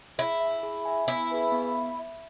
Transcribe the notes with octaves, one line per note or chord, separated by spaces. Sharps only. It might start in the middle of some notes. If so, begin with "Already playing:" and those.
E4 G#4
E5 G#5
G#4
E5 G#5
B3 E4
G#4 B4 G#5
B3